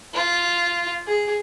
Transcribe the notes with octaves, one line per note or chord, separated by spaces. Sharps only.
F4
G#4